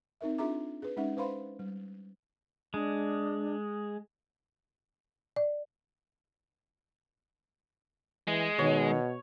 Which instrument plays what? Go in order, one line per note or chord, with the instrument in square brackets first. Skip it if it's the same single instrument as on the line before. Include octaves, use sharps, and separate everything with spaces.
[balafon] C4 D#4 A#4 E5
D4 F4 G#4 E5 A#5 D6
G#4 B4
G#3 C#4 D#4 E5 F#5
B4 C5 F5 B5 C6
G3
[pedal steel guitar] G#3 [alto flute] D4
[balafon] D5
[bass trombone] E3 [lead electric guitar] G#3
[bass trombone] B2 [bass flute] D#3 [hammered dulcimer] C#5